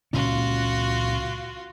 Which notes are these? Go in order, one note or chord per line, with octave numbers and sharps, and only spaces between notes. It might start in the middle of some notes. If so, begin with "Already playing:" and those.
C#2 A#2 C#4 F4 F#4